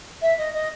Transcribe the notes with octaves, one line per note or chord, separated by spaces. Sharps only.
E5
D#5
D#5